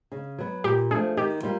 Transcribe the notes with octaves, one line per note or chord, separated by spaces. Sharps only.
C#3
F#3 B3
A#2 G4
F3 A3 D4 G#4
D#3 G4
G3 A#3 F4